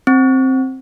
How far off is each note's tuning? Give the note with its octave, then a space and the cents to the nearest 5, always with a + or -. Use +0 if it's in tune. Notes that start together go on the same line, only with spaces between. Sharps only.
C4 +10